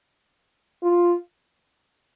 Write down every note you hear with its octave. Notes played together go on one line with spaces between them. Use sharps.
F4